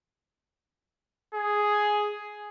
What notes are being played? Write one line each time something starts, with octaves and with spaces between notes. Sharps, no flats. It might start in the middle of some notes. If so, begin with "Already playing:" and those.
G#4